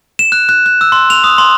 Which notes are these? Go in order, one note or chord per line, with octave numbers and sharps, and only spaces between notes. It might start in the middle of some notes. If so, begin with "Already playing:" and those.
E7
F#6
F#6
F#6
E6
C6
F7
D#6
C6